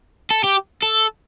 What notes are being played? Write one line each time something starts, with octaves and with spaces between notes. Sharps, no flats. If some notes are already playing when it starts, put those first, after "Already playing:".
A4
G4
A4